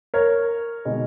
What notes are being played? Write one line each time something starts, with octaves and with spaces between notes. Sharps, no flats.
A#4 C#5
B2 G#3 D#4